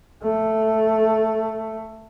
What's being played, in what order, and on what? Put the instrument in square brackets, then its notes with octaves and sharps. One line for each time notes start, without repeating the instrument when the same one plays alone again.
[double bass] A3